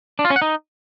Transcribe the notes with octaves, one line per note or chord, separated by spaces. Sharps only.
D4
F4
C#4
F#5
D#4